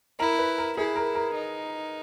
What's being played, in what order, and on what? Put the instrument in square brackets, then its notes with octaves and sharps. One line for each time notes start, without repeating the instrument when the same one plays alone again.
[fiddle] E4 [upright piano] A#4
[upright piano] B4
A#4
[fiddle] E4 [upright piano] G#4
[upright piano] A#4
A#4
[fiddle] D#4